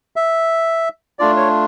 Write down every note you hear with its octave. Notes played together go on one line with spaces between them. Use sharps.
E5
A3 D4 F4 D5
C#5